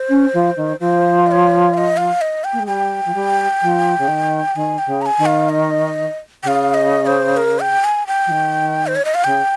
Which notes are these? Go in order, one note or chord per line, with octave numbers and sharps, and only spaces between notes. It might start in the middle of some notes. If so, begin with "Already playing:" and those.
Already playing: C5
C#4
F3
D#3
F3 C5
D#5
C#5
F5
D#5
F5
D#5
G5
A#3
G#3
G3 G5
F3
G3
F3
C#3
D#3
D#3 G#5
G5
C#3
A#5
G#5
D#3
F5
D#5
C#3 F5 G5
D#5
C5
A#4
G5
G#5
G5
F3
D#3
C5
C#5
D#5
F5
C#3 G5